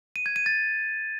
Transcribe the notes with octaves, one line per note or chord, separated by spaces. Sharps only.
D#7
G#6
D#7
A6